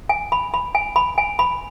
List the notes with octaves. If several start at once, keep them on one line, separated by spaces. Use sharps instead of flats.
G#5
B5
B5
G#5
B5
G#5
B5